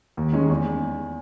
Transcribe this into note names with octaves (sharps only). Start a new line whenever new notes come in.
D#2
D#3 G#3 C#4
E2